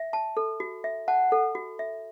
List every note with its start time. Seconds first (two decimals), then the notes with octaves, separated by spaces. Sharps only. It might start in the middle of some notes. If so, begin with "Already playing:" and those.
Already playing: E5
0.13 A5
0.37 A4
0.60 F#4
0.84 E5
1.08 F#5 A5
1.32 A4
1.55 F#4
1.79 E5